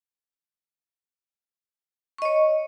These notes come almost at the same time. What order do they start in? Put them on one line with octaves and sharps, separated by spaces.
C#6 D#5 C#5